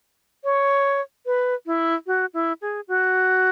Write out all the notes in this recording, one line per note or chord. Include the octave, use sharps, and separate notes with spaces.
C#5
B4
E4
F#4
E4
G#4
F#4